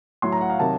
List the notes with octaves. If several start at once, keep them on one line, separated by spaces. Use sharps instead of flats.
A2 F#3 C6
A#5
F#5
F5
C3 D#3 F#3 A5